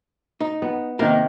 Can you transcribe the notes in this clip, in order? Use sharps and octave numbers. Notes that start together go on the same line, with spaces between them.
D#4
B3
C3 D#3 A#3 A#4